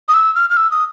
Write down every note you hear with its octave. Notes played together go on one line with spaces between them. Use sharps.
D#6
E6
F6
F6
E6
D#6